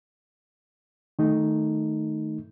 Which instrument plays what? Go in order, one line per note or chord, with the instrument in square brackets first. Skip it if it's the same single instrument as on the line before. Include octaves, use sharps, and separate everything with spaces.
[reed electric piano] D#3 A3 D#4